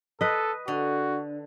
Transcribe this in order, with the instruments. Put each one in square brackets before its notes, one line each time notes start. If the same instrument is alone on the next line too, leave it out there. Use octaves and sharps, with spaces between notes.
[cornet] A4 [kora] B4 D#5
[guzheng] D3 [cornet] F#4